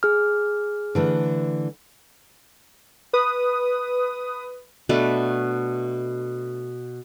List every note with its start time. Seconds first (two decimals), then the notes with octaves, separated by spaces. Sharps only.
0.03 G#4 F6
0.95 D3 E3 A3
3.13 B4 D#6
4.89 B2 A3 D4 B4